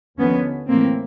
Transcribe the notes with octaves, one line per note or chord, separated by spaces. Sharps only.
D#2 D3 F3 B3 C#4
A2 E3 A#3 C4